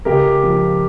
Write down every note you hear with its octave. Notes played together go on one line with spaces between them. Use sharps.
C#2 G4 A#4
F3